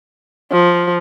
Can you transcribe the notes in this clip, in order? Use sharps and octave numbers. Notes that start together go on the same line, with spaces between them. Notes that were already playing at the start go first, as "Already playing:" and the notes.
F3